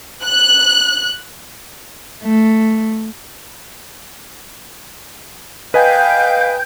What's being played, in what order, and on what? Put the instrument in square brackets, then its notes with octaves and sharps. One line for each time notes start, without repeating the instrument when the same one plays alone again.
[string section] F#6
[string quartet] A3
[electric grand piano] B4 D#5 G#5 [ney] F5 [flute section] G5 G6